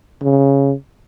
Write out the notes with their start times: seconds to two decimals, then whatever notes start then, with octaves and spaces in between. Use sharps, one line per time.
0.23 C#3